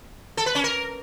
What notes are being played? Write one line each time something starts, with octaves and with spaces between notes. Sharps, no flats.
A4
B4
C#4
A#4